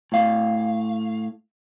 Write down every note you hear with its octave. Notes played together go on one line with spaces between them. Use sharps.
A2 F5